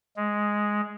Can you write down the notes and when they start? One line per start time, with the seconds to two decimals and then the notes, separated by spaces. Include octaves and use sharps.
0.16 G#3